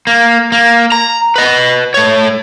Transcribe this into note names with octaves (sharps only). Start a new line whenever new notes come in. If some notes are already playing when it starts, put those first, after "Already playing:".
A#3
A#3
A#5
B4 D#5
A3 C#5